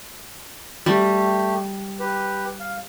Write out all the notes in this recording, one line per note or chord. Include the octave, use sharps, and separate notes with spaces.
G3 A3 G4
G4 B4
F5